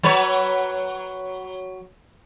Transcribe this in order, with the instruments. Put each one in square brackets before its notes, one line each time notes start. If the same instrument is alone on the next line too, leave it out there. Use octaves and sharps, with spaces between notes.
[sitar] F#3 B4 C#5